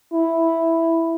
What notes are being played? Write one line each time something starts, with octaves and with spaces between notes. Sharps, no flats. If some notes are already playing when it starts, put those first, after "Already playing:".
E4